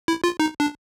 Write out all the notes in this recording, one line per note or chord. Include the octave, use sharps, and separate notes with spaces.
E4
F4
D#4
D4